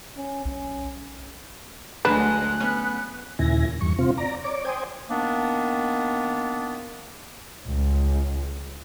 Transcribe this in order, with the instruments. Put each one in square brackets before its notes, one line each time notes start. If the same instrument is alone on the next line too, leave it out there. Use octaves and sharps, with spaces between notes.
[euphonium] C#4
[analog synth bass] B1 [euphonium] C#4
[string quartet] D2 G#3 [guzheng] D3 F#3 A5 [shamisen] B4 [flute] F#6
[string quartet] B3 [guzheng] C#4
[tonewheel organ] D#2 A#2 C#3 E4 G#5 A#6
E2 G2 C#6
C3 C4 F4
D5 A#5
C#5 D5 D6
C5 G5 G#5 D#6
[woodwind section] D#3 A#3 B3 D4
[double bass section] C#2